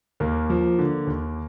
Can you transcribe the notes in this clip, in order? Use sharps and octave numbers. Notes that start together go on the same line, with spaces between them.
D#2 A#3
F3
D3
D#2